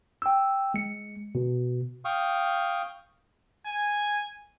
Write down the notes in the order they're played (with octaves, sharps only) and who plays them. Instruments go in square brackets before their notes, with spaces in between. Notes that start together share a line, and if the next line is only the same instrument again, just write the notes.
[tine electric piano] G5 E6
G#3 C#7
B2
[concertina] F5 G5 C#6 D#6
[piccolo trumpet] G#5